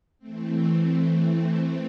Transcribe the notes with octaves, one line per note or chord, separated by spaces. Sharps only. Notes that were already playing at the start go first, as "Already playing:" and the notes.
E3 A3 C4